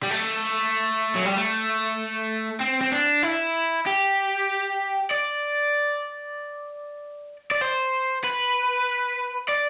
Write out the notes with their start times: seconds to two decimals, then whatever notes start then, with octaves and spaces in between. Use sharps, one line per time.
0.03 G3
0.11 A3
1.15 F#3
1.25 G3
1.36 A3
2.61 C4
2.82 C4
2.92 D4
3.23 E4
3.86 G4
5.11 D5
7.51 D5
7.61 C5
8.24 B4
9.49 D5